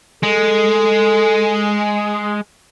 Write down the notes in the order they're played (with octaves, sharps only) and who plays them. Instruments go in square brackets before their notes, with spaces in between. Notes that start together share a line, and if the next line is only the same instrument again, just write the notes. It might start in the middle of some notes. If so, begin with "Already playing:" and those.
[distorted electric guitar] G#3 [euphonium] A4